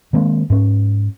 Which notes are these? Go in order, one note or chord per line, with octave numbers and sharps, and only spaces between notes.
D#3 G#3 A#3 C4
G#2 C#4